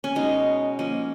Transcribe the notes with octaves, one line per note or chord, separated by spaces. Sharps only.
C#4
B2 G#3 B3 D#4
F3 A#3 C#4